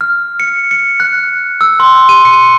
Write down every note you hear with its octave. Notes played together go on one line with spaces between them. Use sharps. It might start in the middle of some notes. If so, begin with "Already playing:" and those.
F6
C#7
C#7
F#6
E6
C6
D#7
C#7